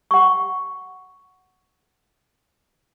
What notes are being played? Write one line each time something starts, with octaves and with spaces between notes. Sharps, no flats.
F#5 C#6